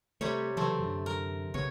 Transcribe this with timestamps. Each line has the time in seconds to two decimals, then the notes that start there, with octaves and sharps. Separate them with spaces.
0.21 C3 G3 A3 C#5
0.57 C#3 E3 F#3 A3 C4
0.80 F#2 D3
1.06 A#4
1.54 B1 C#3 B3 C#5